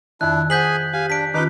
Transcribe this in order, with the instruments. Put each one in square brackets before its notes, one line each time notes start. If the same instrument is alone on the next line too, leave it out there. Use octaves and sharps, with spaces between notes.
[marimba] F2 D#3 [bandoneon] D4 E4 [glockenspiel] F#6
[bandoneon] G#4 G#5 [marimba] C5 F#5 [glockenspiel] G6 B6 F#7
[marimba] G4 [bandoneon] F5 G#5
[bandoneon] D4 [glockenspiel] B6 D7
[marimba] D#3 C#4 F4 [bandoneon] D#4 B4 D6